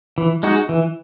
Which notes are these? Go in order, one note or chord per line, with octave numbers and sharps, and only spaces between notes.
E3
G#3 D#4 F#4
E3